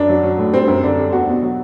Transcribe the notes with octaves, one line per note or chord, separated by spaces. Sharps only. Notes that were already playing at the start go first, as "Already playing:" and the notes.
Already playing: F#2 D4
F#3
F#3
A2
G3 C4
F#2
D3 D4
G3
E2 F#4
B2
F#3